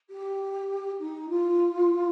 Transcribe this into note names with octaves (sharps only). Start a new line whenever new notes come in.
G4
D#4
F4